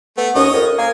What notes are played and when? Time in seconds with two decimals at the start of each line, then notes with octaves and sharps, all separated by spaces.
0.17 A3 B3
0.35 D#2 C#4 C#5 D#5 D#6
0.54 F2 A#4
0.78 A#3 G#5